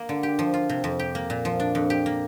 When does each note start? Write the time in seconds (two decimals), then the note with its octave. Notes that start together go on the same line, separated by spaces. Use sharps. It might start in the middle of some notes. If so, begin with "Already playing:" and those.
Already playing: A#3
0.09 D3
0.23 G4
0.39 F3
0.54 F4
0.69 C3
0.84 F2
0.99 G4
1.15 A#3
1.30 A#2
1.45 F3
1.60 D4
1.75 F2
1.90 G4
2.06 A#3